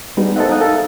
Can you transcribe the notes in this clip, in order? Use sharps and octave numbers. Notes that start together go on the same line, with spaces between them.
G3 G#3 B3 D#4 F#4 G#4
A4 A#4 C5 D#5 E5 F#5
D#4 F5 G5 D#6 F#6
A4 A#4 E5 F5